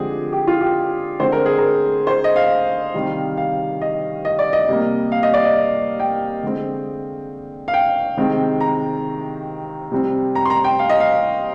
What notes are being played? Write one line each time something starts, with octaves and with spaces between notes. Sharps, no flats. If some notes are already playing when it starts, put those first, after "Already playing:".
Already playing: D3 F3 G#3 C4 G4 G#4
G4
F4
G4
D3 G#3 C4 C5
A#4
G#4
A#4
C5
D#5
F5
C3 D#3 G3
F5
D#5
D#5
D5
D#5
C3 G3 A#3
F5
D#5
D5
D#5
G5
D3 G#3 C4
F5
G5
C3 D#3 G#3 C4
A#5
C3 G3 C4
A#5
C6
A#5
G5
F5
D#5
F5